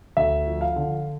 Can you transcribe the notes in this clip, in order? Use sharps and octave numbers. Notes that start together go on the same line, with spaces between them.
D2 E5
F3
F5
D3